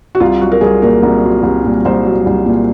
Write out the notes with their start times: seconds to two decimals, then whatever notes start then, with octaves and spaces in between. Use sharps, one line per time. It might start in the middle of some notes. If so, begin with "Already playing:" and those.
0.15 F#4
0.20 C2 F4
0.41 F#3 F#4
0.52 A#4
0.61 C2 G#4
0.82 A#2 A#4
1.03 C2
1.23 F#3
1.43 C2
1.64 A#2
1.85 C2 C5
2.05 F#3
2.26 C2
2.46 A#2